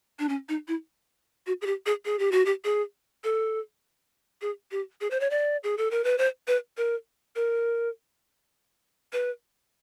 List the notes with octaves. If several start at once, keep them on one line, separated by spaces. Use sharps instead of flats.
D4
C#4
D#4
E4
F#4
G#4
G4
G#4
G#4
G4
F#4
G4
G#4
A4
G#4
G4
G#4
C5
C#5
D5
G#4
A4
A#4
B4
C5
B4
A#4
A#4
B4